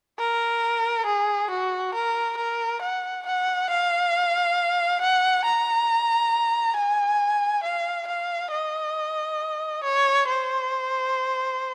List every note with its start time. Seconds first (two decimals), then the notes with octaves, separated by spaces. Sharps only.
0.19 A#4
1.06 G#4
1.50 F#4
1.94 A#4
2.38 A#4
2.82 F#5
3.26 F#5
3.70 F5
5.01 F#5
5.45 A#5
6.76 G#5
7.63 F5
8.07 F5
8.51 D#5
9.84 C#5
10.27 C5